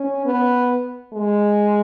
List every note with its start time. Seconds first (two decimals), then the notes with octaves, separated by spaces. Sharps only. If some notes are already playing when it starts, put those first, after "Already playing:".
Already playing: C#4
0.25 B3
1.13 G#3